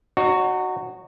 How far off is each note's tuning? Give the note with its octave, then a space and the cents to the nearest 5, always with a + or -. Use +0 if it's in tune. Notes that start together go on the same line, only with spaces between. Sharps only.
D#4 -35 F#4 +0 C#5 +0